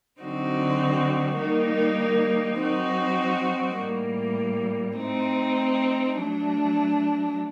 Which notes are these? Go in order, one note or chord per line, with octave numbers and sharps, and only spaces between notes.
D3 F#3 C4 D#4 F#4
D#3 G3 A#3 D#4
F#3 C4 D#4 F#4
A2 G3 A#3
A3 C4 D#4
F#3 A3 D4